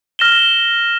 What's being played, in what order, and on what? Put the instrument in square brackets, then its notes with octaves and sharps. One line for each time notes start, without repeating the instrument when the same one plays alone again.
[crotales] F6 A#6 E7 G7